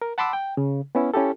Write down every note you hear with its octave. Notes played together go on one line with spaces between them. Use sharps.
A#4
F#5 A5 B5 C6 D6 E6
G5
C#3
B3 C#4 E4
C#4 E4 G4 A4